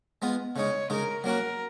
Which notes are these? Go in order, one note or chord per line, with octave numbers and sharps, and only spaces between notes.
G#3 B3 F4
C#3 G#3 D#4 C#5
C#3 G#3 D#4 A#4
F#3 A#3 C#4 F#4 A#4